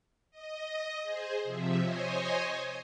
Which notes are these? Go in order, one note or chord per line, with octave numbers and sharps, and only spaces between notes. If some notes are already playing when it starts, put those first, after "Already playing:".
D#5
G#4 C5
C3 F3 E5
C5 C#5 D#5 G#5